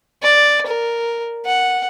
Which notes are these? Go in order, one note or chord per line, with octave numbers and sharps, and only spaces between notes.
D5
A#4
F#5